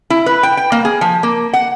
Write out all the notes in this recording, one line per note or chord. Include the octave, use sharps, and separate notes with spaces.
E4
B4
G5
G5
A#3
G#4
F3
A#3
F#5